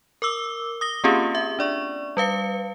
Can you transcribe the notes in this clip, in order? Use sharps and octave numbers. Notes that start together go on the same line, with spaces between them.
A#4 D6 E6 G7
D#6 A#6 G7
A#3 C4 C#4 F4 G4 G#4
E5
D4 D5 C#6
G3 B4 F5 C#7